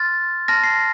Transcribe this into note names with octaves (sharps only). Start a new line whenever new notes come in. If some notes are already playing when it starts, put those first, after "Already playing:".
Already playing: C6 F6 A6
A5 C6 F6 A#6
C7